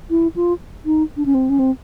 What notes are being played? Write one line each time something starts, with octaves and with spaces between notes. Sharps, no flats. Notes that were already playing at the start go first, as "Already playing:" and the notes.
E4
F4
D#4
D4
C#4
C4
C#4
C4